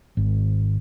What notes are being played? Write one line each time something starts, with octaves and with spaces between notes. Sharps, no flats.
G#1